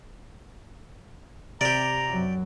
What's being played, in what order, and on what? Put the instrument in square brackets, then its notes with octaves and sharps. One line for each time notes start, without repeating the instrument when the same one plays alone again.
[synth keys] C3 [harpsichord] G4 D5 [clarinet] A#5
[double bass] F#2 F#3